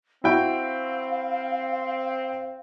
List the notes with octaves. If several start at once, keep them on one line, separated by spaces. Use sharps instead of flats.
C4 E4 F#4 F5 G5